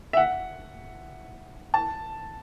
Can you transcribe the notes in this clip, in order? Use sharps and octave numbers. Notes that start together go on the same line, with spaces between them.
E5
F#5
A5